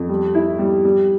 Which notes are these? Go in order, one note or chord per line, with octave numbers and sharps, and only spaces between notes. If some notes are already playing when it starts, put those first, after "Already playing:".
Already playing: F2
G3
E4
G3
G3